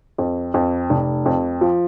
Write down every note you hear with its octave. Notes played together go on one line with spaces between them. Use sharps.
F2
F2
F1
F2
F3